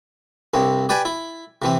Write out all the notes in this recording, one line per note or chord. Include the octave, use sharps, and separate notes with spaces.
C2 G2 C4
G4 B4 D5 G5 G#5
E4
C3 E3 C4